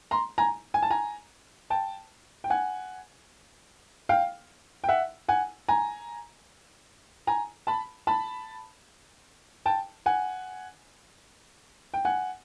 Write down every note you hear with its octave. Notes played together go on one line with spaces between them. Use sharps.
A#5 C6
G#5 A#5
G#5
A5
G#5 A#5
G5 A5
G5
F#5 G#5
F5 G5
G5
E5 F#5
F#5 G#5
G#5 A#5
G#5 A#5
A5 B5
A5 B5
G5 A5
F#5 G#5
G5
F#5 G#5